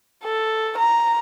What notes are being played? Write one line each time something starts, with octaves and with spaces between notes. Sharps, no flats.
A4
A#5